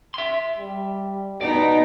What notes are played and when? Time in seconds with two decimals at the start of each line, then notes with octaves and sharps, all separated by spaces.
0.14 E5 C6
0.59 G3
1.41 B2 B3 D#4 D5